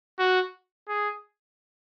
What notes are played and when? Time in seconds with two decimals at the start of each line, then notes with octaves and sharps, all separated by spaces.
0.19 F#4
0.88 G#4